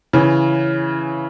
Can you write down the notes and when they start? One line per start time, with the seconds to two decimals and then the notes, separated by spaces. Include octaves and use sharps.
0.13 C#3 E3